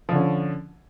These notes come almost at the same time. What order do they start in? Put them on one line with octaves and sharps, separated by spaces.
F3 D3 C#4